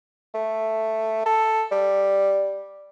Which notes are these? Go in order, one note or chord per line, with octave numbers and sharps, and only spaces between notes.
A3
A4
G3